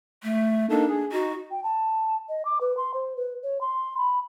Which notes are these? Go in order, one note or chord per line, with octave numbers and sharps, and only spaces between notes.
A3
A#3 D4 D#4 A4
G#4
D#4 F#4
G5
A5
D#5
D6
B4
C6
C5
B4
C#5
C6
B5